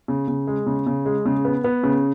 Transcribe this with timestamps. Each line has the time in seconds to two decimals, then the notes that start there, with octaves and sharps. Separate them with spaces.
0.08 C#3
0.28 C#3
0.47 G#3
0.66 C#3
0.87 C#3
1.06 G#3
1.26 C#3
1.45 B3
1.64 B3
1.84 C#3